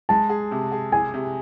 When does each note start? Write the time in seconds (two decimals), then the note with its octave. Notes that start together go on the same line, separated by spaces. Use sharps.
0.09 G#3 A5
0.30 G#4
0.51 C3
0.72 G#4
0.92 G#4 G#5
1.14 C3